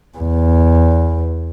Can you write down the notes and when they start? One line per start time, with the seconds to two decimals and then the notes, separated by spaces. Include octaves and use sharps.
0.18 E2